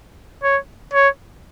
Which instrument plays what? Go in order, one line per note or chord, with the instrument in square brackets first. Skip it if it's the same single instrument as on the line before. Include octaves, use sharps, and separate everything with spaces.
[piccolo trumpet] C#5
C#5